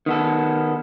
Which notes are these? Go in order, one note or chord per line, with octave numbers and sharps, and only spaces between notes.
D#3 B3 A4